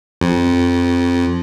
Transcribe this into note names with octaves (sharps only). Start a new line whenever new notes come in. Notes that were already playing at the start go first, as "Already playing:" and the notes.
F2